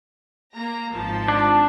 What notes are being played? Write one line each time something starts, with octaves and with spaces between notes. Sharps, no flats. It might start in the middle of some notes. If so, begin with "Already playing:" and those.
A#3 A#5
G#1 F3 A5
D4